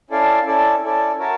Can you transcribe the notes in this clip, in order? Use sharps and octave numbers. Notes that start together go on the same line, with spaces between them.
C#4 E4 A4 D5 F5
C#4 E4 A4 D5
C#4 E4 A4 D5
F#4 A#4 C#5 E5 A5